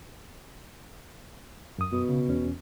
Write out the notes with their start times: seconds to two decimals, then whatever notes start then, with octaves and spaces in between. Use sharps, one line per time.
1.78 F#2 D#6
1.92 B2
2.09 C#3
2.28 E2 C#4